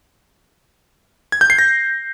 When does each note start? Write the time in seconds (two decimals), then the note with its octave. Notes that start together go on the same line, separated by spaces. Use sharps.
1.32 G#6
1.41 G6
1.50 C7
1.59 A#6